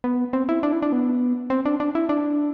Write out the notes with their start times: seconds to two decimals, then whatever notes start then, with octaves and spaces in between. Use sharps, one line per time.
0.04 B3
0.33 C4
0.49 E4
0.63 D4
0.72 E4
0.82 D4
0.92 B3
1.50 C4
1.65 D4
1.80 D4
1.95 E4
2.09 D4